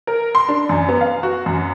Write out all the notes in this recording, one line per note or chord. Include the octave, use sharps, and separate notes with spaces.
A#4
C6
D4
F#2
B3
F5
F#4
F#2